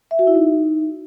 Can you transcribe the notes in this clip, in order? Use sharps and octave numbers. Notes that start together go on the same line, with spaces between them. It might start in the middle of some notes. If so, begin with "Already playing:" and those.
E5
F#4
E4
D#4